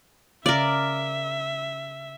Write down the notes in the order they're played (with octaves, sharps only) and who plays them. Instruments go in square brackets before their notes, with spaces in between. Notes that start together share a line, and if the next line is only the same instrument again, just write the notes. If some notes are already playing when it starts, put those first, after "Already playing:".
[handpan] C#3 C#4 F5 [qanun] A#4 D5 [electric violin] E5